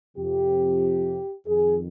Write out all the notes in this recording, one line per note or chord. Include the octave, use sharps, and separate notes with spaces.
F2 C3 F3 G4
F2 D#3 G#4